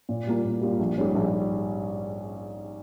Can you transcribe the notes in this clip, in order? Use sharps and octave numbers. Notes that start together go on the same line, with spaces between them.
A#2
G3 A#3 F4
A#2
G3 A#3 F4
A#1
G#2 G3 C#4
A#1